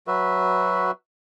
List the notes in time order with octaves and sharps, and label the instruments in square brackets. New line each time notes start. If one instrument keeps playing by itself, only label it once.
[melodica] F#3 F#4 B4 E5